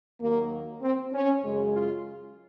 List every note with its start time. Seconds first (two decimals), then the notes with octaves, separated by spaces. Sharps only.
0.20 D#2 D#3 F#3 A#3
0.82 C4
1.13 C#4
1.43 F#2 C#3 G#3
1.74 F4